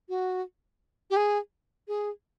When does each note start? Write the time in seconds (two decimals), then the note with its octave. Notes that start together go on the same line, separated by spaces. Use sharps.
0.09 F#4
1.10 G4
1.16 G#4
1.88 G#4